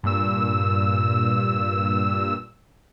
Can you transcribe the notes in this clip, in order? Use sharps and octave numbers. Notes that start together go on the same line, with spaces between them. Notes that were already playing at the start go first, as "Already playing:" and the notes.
G2 A#2 E6